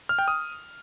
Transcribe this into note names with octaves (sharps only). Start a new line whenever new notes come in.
F6
G5
D#6